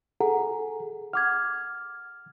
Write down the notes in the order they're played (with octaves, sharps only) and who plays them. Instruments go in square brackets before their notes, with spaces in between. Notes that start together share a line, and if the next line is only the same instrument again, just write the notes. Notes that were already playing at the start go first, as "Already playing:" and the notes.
[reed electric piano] G#4 [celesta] A4 F#5 A#5
[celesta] F#5 D6 G#6 [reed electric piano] F6